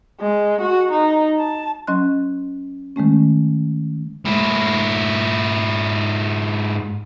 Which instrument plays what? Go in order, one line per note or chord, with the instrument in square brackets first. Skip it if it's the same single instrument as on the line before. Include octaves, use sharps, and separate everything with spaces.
[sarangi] G#3
F#4
D#4
A5
[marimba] F#3 C#4 D#5 C6 F#6
D#3 G#3 A3 C#4
[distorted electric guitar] G#2 E4